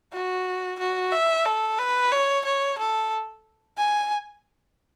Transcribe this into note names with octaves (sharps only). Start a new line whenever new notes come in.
F#4
F#4
E5
A4
B4
C#5
C#5
A4
G#5